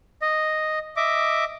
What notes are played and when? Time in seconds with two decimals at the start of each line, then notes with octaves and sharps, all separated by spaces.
0.22 D#5
0.97 D#5 E5 D6